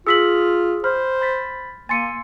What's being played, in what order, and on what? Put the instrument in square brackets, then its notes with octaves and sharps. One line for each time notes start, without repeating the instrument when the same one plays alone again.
[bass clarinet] F4 [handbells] G#4 [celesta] E6 B6 F#7
[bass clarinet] C5 [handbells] B5 [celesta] F6
[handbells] B5 A6 B6
[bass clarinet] A#3 [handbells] G#5 C6 E6 [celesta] A6 C#7 D#7